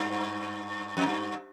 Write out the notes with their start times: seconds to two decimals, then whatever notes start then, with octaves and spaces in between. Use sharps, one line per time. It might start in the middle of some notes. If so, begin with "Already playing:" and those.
Already playing: G2
0.97 F2
1.06 G2